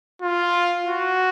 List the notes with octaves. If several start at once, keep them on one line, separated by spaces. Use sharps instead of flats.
F4
F#4